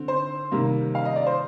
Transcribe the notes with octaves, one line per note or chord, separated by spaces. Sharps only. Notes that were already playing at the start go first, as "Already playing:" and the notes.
Already playing: D3 C4
C5
C3 D#3 G3 A#3
F5
D#5
D5
C5